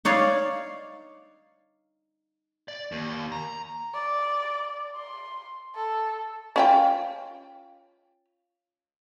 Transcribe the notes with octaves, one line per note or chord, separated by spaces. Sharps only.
D#4 C#5 D5 F5
D5
D#2
A#5
D5
C6
A4
C#4 F4 G5